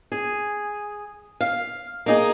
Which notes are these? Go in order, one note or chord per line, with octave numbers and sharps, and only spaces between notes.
G#4
F5
A#3 D#4 G#4